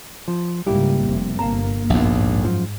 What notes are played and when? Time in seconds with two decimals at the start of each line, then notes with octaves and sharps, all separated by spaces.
0.28 F3
0.66 C#2 G#2 G3 A#3 E4 G4
1.07 F1 C3
1.39 G1 A#3 F5 A5 A#5
1.90 A#1 D#2 G#2 B3 E5
2.40 F#2 F3